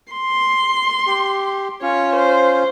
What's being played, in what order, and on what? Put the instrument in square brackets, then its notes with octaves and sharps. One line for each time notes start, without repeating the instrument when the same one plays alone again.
[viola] C6
[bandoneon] G4
[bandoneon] C#4 F4 [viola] C#5
[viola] C5